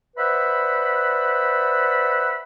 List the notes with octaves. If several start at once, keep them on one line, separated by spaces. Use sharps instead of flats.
B4 C5 D5 E5 F#5 B5